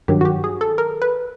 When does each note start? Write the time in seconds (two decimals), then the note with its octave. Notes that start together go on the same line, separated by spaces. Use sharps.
0.08 G2 D#3 F#3 G4
0.21 F#4
0.25 G4
0.44 G#4
0.61 A4
0.78 A#4
1.02 B4